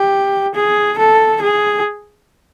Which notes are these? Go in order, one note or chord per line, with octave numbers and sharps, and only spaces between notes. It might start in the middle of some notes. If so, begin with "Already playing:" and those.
Already playing: G4
G#4
A4
G#4